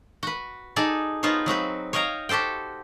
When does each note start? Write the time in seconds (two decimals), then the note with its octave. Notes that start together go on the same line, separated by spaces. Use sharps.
0.23 F#4 B4
0.76 D#4 G#4 A4 D5
1.23 B3 D#4 F4 C5 C#5
1.46 F#3 C4 F#4 B4
1.93 C#5 D#5 F5 G5 A#5
2.29 F#4 G4 A4 C5 G5